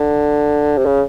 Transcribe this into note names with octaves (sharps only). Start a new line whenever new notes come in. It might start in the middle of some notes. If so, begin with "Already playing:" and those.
Already playing: D3
C3
C#3